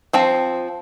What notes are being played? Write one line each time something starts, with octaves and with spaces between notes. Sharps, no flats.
F3 C4 C5